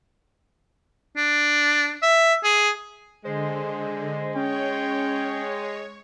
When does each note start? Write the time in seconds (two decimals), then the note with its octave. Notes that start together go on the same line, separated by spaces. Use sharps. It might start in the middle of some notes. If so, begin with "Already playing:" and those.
1.17 D4
2.03 E5
2.44 G#4
3.25 D3 G#3 C5
4.35 C#4 C#5 G5